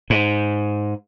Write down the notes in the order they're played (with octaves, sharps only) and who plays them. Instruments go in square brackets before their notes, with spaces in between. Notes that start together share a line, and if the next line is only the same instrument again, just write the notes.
[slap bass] G#2